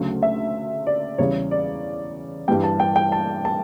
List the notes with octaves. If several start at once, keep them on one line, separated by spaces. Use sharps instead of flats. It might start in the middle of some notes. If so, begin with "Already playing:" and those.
Already playing: D2 C#3 F#3 A3
E5
D5
E2 C#3 G3 C#5
D5
G2 E3 G3 G5
A5
G5
G5
A5
A5